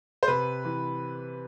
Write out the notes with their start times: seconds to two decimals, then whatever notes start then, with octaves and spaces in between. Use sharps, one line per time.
0.23 C5
0.28 C3 B4
0.65 E3